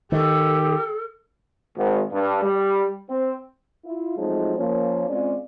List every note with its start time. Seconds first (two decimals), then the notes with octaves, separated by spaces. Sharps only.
0.12 D#3 G4 A4
1.77 G#1
2.12 G2
2.43 G3
3.10 C4
3.85 E4 F4
4.17 F3 F#3 G#3 A3 C4 D#4
4.57 F3 A#3 C#4
5.08 G#3 C4 C#4 F4 D5